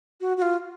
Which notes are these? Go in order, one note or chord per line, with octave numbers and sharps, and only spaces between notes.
F#4
F#4
F4